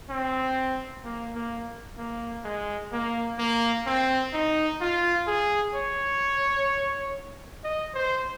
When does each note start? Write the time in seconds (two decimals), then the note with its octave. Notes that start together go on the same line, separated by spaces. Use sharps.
0.10 C4
1.04 A#3
1.35 A#3
1.98 A#3
2.44 G#3
2.93 A#3
3.39 A#3
3.86 C4
4.33 D#4
4.81 F4
5.27 G#4
5.74 C#5
7.64 D#5
7.94 C5